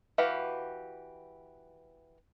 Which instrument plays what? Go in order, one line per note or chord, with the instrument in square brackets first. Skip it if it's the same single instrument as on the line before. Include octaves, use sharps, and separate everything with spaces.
[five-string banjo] E3 F#4 G4 B4 F5